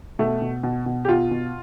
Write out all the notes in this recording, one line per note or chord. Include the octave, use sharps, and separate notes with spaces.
B2 A3
B2
B2
B2
G4
B2 F4
B2